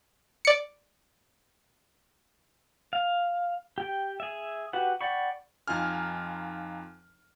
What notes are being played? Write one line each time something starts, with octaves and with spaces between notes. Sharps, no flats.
D5 C#7
F5
G4 G5
G#4 E5
F#4 G4 B4 F#5
D5 F#5 G5 B5 C#6
F2 D#4 F4 G#5 F6